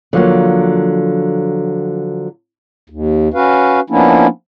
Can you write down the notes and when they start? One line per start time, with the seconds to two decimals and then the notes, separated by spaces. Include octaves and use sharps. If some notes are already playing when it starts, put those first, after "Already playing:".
0.13 D3 F3 F#3 A#3
2.90 D#2
3.34 C#4 F#4 B4 F5
3.90 F3 A#3 B3 C#4 D4 E4